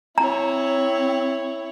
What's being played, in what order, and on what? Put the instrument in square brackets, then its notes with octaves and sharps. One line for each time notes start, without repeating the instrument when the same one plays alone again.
[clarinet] C4 [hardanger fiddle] E4 C#5 [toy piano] A#5